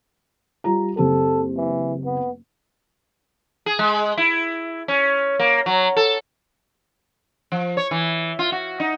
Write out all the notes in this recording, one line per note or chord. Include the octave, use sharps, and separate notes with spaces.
G3 F4 A#5
F#1 C4 G4 A4
E3
B3
G#4
G#3
E4
C#4
A#3
F#3
A4
F3
C#5
E3
F4
F#4
D#4